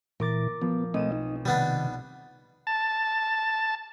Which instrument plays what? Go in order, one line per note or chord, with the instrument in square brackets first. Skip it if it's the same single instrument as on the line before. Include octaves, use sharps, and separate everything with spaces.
[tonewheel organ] A#2 E3 [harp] A#4 D6 A6
[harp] F3 [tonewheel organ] B3
[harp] B1 D#7 E7 [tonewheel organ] A3 C4 D#5
[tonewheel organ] D#4
[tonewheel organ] C3 D#3 [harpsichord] G3 B3 D4
[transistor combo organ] A5